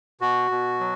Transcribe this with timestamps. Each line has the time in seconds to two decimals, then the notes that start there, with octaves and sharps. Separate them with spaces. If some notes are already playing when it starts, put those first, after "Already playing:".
0.21 B2 F#4
0.51 B2
0.80 F#3